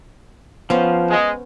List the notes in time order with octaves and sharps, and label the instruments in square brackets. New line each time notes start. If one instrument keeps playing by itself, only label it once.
[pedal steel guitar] F3 [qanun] B3 C#4 C5
[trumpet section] G#3